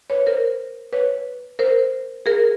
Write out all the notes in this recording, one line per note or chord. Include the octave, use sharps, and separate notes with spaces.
B4 C#5
A#4 C5
B4 C#5
A#4 C5
G#4 A#4